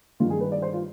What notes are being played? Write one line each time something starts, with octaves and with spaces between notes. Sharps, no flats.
G2 D#3 G3 F4
G#4
B4
D5
C5
F4